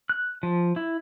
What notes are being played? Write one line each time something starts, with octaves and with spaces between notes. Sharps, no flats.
F#6
F3
E4